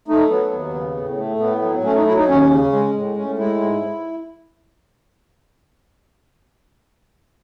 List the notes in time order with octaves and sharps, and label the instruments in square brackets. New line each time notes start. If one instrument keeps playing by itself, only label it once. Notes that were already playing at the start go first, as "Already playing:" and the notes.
[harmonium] A3 D#4
F#3 B3
D#2
C#3
A2
A3
A2 B3
F#3
A3 C#4
D#4
F#3 E4
D#4
D#2 C#4
C#3
G#3
A2
A2 C#4
G#3 E4
G#2